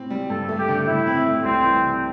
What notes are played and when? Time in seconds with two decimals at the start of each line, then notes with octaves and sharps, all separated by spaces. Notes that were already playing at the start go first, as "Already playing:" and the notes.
Already playing: A2 C4
0.10 G3
0.30 G2 A4
0.49 A3
0.59 G4
0.68 D3
0.87 A2 E4
1.07 C4
1.26 A3
1.44 C2 C4
1.63 E3
1.83 C3